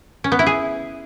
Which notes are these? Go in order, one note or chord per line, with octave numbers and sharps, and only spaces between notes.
C#4
B3
E4
G#4